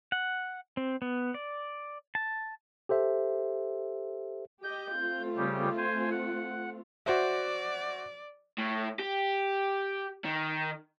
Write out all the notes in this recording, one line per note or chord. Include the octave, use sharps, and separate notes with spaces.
F#5
C4
B3
D5
A5
G4 A4 C5 E5
G4 D#5 G6
A3 C4 F4
C#3 G3 G4
C5 G#5
F#5
F#4 C5 D5 E5
A2
G4
D#3